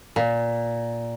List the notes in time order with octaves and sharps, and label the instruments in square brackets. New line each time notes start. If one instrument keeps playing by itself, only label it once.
[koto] A#2